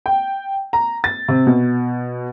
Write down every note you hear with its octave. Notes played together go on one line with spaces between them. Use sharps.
G5
A#5
A6
C3
B2